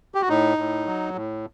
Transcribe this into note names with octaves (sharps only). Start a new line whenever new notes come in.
G4
F#4
A2 D#4
A2
F#3
A2